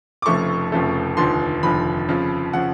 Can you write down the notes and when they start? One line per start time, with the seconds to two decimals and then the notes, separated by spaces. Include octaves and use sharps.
0.22 D6
0.26 F1 F2 C#3 F3 A3 C#6
0.72 F1 F2 C#3 F3 A3
1.17 F1 D#2 D3 F3 C6
1.63 F1 D#2 D3 F3 B5
2.09 F2 C#3 F3
2.53 C#3 F3 F#5